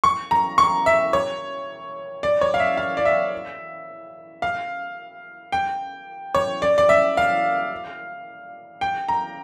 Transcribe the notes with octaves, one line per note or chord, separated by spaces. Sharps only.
C#6
A#5
C#6
E5
C#5
D5
C#5
F5
E5
F5
D5
E5
F5
G5
C#5
D5
D5
E5
F5
G5
A#5